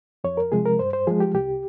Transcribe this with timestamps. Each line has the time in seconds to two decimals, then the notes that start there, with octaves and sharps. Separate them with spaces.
0.24 F2 C#5
0.37 A#4
0.52 C3 F3 G#3 G#4
0.66 A#4
0.79 G2 C5
0.93 C5
1.07 F3 G#3 G#4
1.20 G4
1.34 C2 G4